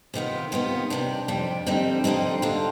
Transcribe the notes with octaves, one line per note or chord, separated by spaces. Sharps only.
C3 D#3 B3 F4
C3 D#3 B3 F4
F2 C3 G3 D4
F2 C3 G3 D4
F2 D3 G3 C4 D#4
F2 D3 G3 C4 D#4
D3 G3 D4 F4